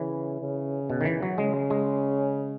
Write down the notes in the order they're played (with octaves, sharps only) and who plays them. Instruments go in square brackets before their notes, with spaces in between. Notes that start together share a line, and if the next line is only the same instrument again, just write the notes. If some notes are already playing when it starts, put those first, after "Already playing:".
Already playing: [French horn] C#3 [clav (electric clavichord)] E3
[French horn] C#3
[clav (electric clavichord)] B2
D#3
E3
F#3
[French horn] C#3 [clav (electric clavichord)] G#3
[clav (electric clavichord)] G#3